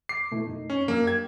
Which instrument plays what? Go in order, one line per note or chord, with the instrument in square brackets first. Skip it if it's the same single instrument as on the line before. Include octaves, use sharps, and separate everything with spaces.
[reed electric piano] D6 [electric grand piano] C7
[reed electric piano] B2 A3 E4
F#2 D#4
[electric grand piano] C#4
[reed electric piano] F#2 D4 E6 [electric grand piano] A#3
[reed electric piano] G4 [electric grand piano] G#6